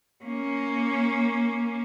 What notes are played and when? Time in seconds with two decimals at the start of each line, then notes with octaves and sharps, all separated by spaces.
0.24 A#3 C#4